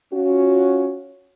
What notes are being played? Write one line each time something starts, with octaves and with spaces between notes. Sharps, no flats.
C#4 F4 F#4